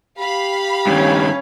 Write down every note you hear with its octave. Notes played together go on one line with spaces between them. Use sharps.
G4 F5 B5
G2 D#3 C#4 C#5